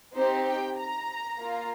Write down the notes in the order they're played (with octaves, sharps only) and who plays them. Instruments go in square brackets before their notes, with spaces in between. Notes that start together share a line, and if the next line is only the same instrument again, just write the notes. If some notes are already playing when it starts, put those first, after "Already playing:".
[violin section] C4 D#4 G4 C5
G5
A#5
A#3 F4